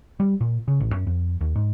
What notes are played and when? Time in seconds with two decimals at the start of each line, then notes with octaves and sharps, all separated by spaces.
0.20 G3
0.41 A#2
0.68 C#3
0.80 A1
0.93 F#2
1.07 F2
1.41 D#2
1.55 G#2